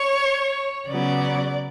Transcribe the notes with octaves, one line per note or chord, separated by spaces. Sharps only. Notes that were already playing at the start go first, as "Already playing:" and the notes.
Already playing: C#5
C#3 F#3 B3 D5